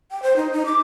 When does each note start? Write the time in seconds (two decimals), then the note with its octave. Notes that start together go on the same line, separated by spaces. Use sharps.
0.11 G5
0.23 C5
0.36 D#4
0.52 D#4
0.66 D6